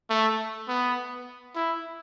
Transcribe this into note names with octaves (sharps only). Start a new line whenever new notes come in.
A3
B3
E4